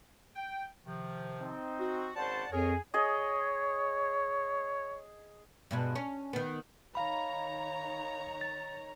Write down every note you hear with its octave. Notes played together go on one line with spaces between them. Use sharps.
G5
C3 D#3 F3
C4 D#4
F#4
G#1 C#3 C5 D5 F#5 A5
F2 G#4 A#4 C#5
G#4 C#5 D#5
G2 B2 G#3
C#4
D#3 B3
D#3 C#5 F5 A#5 B5
A6